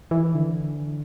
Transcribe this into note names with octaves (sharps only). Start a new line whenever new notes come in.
E3
D3